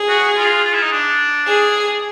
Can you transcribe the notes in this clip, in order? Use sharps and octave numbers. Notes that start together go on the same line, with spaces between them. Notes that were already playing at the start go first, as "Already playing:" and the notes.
Already playing: G#4
F#4
F4
F4
E4
D#4
D4
G#4